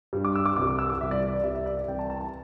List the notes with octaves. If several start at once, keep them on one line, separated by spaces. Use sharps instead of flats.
G2 G3
D6
E6
D6
C2 C3 E3 G3 D6
D6
E6
D6
C2 C3 E3 G3 E5
D5
D5
C2 C3 G3 E5
E5
D5
D5
C2 C3 E3 G5
A5
A5
A5